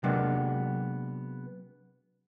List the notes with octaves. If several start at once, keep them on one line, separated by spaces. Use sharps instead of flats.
C3 F#3 G#3 A#3 B3 D4